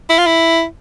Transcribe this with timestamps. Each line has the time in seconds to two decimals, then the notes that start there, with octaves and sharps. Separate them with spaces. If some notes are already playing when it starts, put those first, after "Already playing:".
0.09 E4
0.19 F4
0.26 E4